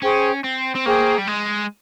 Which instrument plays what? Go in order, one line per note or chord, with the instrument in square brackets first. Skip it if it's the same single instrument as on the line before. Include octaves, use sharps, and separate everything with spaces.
[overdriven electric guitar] C#4 [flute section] G#4 C5 G5 C#6
[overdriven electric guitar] C4
C4
[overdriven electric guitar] A#3 [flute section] G#4 C5 G5 C#6
[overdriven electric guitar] G3
G#3